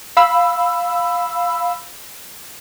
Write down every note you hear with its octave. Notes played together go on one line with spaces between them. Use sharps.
F5 B5 E6